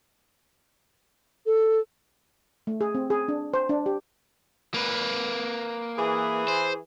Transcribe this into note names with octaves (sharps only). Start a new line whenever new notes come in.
A4
A3
G#4
C4
G#4
D4
C5
D4
G4
A#3 B4
E3 G#4
C5